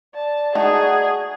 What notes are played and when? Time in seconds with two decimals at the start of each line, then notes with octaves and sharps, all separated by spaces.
0.14 D5 A5
0.55 A3 D#4 F#4 G#4